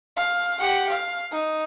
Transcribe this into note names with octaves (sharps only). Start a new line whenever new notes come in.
F5
G4 F#5
F5
D#4